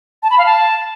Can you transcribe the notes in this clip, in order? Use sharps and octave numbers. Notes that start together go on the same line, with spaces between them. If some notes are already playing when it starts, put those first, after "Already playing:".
A5
B5
F5
A5